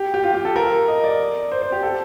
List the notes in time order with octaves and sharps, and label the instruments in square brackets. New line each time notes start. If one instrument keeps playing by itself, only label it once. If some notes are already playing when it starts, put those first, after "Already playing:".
Already playing: [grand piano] G4
G4
F4
G4
A4
A#4
D#5
D5
C5
C5
G4
A4